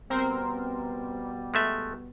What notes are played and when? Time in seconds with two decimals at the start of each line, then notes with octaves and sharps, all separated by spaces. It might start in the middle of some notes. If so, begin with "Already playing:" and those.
0.10 B2 G3 B3 C4 A#4 C5
1.54 G#3 A3 E5